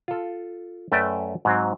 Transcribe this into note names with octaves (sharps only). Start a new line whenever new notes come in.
F4 A4
F#2 A3 B4 D5 G5 A5
G#2 F#3 C4